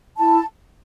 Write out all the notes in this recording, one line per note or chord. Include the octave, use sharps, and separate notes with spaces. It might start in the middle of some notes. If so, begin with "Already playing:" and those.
E4 A5